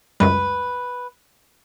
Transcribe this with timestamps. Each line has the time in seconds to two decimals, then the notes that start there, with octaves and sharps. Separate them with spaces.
0.20 C#2 F#2 G3 B4